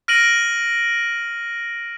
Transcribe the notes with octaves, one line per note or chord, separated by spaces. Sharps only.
F6 A#6 D7 D#7 F#7